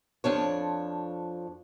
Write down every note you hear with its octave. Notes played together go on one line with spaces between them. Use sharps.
F2 F3 D4 C#5